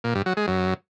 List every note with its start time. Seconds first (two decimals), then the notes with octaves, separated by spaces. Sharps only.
0.04 A#2
0.15 G2
0.26 F#3
0.37 G#3
0.48 F#2